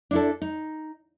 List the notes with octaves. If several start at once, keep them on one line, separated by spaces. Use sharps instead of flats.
D4 E4 A4
D#4